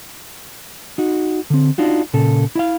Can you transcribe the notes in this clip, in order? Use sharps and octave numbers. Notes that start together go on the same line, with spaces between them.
D#4 F#4
D3 C4
D4 D#4 F4 F#4
A#2 C#3 A4
E4 E5 F5